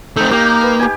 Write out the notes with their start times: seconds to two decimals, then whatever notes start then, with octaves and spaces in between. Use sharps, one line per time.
0.17 A3 C4 D#4
0.31 A#3 D#4 G4
0.63 B4
0.79 G4 G#5